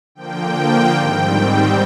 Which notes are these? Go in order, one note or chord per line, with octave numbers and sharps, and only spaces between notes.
D3 F3 A#3 G5
G#2 D#3 G3 C4 G5